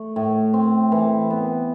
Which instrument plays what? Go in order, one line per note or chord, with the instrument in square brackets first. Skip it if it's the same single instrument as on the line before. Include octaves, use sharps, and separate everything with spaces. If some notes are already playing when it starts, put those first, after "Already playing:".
Already playing: [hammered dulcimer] A3
A2
C4
E3
B3